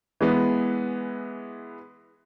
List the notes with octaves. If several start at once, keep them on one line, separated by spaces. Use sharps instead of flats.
E3 G#3 B3